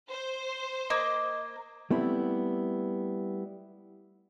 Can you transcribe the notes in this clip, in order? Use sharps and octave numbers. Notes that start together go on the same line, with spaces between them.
C5
A#3 D#5
G3 A3 B3 C4 E4